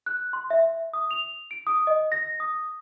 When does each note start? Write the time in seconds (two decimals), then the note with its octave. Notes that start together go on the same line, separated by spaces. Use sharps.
0.06 F#6
0.33 C6
0.50 E5
0.93 D#6
1.11 F7
1.51 D7
1.67 D#6
1.87 D#5
2.12 A#6
2.40 D#6